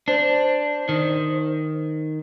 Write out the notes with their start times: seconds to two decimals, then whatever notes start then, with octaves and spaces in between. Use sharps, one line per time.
0.08 D4 C5
0.89 D#3